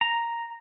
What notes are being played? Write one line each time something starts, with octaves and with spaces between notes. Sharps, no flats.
A#5